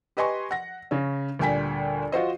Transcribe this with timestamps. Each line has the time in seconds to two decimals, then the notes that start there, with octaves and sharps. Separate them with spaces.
0.17 G4 B4 D#5 G#5 C6 C#6
0.51 F#5 A#6
0.91 C#3 C#4
1.39 D2 A#2 G3 G5 G#5 B6
2.12 F4 F#4 C5 D#5